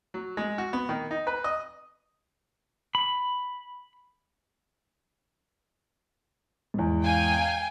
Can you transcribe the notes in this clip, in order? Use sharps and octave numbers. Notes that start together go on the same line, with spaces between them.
F#3
G#3
F#4
B3
D#3
D#4
B4
D#5
B5
E2 G#2
F5 G5 G#5